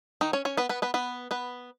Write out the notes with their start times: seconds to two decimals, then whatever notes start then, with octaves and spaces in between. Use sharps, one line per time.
0.21 D#3 D#4
0.33 C#4 C#5
0.45 C#4 C#5
0.57 B3 B4
0.69 B3 B4
0.82 B3 B4
0.94 B3 B4
1.31 B3 B4